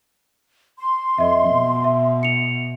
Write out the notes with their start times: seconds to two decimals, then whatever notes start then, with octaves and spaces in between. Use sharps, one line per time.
0.79 C6
1.18 F2 D#5 E5
1.50 B2
1.84 E5
2.23 C#7 F7